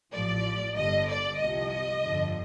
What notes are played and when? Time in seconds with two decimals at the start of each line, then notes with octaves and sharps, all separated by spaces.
0.13 A1 A2 F3 D5
0.76 G1 G2 D3 D#5
1.08 D5
1.39 C2 C3 F3 D#5
2.02 G1 F2 D3 F3